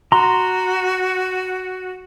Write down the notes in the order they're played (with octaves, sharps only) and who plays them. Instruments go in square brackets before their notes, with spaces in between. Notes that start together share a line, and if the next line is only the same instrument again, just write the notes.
[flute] F#4 [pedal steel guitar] A#5 C6